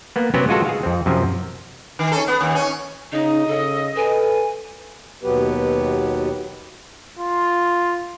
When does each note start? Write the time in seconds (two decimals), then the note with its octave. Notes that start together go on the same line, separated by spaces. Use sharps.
0.16 A#3 B3
0.34 C3 F#3 B3 C#4 F#4 G4
0.49 G#3 F4 F#4 A4
0.66 G#4 F5
0.83 F2 C4
1.06 F#2 C3 F3
1.99 D#3
2.12 C#4 A4
2.28 B3
2.41 D#2
2.55 C#4
3.12 C#3 D#4 D#5
3.47 C#3 A4
3.97 A4 B4 G#5
5.23 D#2 B2 F#3 B3 G4 B4
7.19 F4